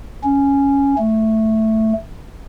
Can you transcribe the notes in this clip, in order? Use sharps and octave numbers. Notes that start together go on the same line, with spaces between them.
C#4
A3